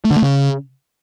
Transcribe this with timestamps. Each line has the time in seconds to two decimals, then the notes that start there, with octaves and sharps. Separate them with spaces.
0.05 A3
0.11 D3
0.16 A3
0.22 C#3